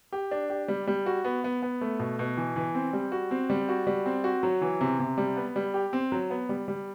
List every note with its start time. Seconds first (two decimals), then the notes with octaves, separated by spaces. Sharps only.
0.12 G4
0.31 D4
0.50 G4
0.68 G3
0.87 G3
1.06 F#4
1.24 B3
1.44 B3
1.62 B3
1.81 A3
1.99 B2
2.19 B2
2.37 E3
2.56 E3
2.75 C4
2.93 G3
3.12 F#4
3.31 C4
3.50 G3
3.69 F#4
3.87 G3
4.06 C4
4.24 F#4
4.43 F#3
4.61 E3
4.81 C3
4.99 C3
5.18 G3
5.37 B3
5.56 G3
5.74 G4
5.93 C4
6.12 F#3
6.30 B3
6.49 G3
6.68 G3